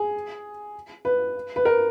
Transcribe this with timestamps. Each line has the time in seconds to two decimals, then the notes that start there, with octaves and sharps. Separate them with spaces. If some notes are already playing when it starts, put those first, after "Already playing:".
Already playing: G#4
1.05 B4
1.56 B4
1.65 A#4